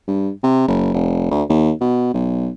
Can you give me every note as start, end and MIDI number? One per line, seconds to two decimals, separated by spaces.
0.07 0.30 43
0.43 0.66 48
0.68 0.93 30
0.93 1.30 29
1.31 1.43 38
1.49 1.72 39
1.81 2.12 47
2.14 2.48 35